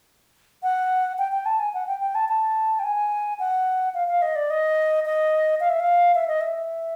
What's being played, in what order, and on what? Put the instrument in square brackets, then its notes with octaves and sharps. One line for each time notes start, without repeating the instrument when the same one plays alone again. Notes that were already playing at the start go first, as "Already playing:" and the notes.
[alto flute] F#5
G5
G5
A5
G#5
F#5
G5
G5
A5
A5
G5
G#5
F#5
F5
F5
D#5
D5
D#5
D#5
F5
E5
F5
E5
D#5
E5